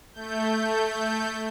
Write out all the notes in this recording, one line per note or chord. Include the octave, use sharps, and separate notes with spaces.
A3 G6